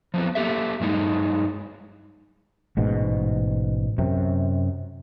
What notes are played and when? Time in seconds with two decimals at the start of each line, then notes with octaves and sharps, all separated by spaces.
0.14 F3 B3 C4
0.35 A#3 G4 A4 E5
0.80 G2 F#3 G#3 D#4
2.77 A1 G#2 B2
3.98 F#2 C3